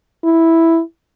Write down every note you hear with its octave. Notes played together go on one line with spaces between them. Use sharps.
E4